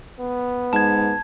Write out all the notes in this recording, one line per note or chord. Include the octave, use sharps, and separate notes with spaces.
B3
G#2 A5 G#6